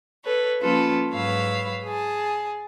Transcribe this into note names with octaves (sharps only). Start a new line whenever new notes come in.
A4 B4 C#5
F3 A#3 C#4 F4 A4 B4
G#2 F#3 B4 C#5 F5 E6
G#4 A5